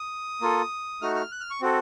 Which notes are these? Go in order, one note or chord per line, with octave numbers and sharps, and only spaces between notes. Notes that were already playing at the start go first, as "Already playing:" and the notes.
Already playing: D#6
A#3 F4 A4
A3 D#4 F#4 F6
F6
F#6
F6
C#6
C4 F#4 A4